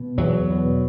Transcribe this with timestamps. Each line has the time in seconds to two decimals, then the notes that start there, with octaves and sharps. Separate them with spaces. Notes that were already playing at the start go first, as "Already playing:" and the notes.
Already playing: B2
0.18 E2 F#3
0.50 B2